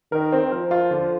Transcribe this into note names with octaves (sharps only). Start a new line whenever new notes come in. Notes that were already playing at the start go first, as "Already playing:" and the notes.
D#3 A#4
C4
F3 A#4
F4
D3